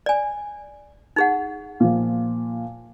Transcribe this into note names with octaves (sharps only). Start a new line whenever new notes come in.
D5 G#5
D#4 G#4 F#5
A#2 F3